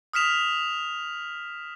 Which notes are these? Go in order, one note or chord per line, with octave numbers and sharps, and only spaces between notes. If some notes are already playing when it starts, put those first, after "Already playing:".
D#6 F6 B6 E7 F7